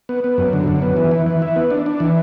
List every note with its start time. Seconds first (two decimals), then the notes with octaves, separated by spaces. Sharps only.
0.09 B3
0.24 B3
0.38 F#2
0.53 D3
0.68 F#2
0.82 B3
0.97 E3
1.11 E3
1.26 E3
1.42 E4
1.56 B3
1.70 D4
1.86 D4
2.00 E3